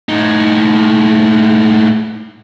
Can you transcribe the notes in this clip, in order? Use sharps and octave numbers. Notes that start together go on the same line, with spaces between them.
A2 D#4